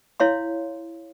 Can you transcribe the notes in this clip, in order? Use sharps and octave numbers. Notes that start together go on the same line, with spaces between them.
E4 C#5 F5 C6